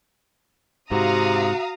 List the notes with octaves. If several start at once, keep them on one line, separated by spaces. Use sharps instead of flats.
G#2 C3 F#4 F5 A#5 D#6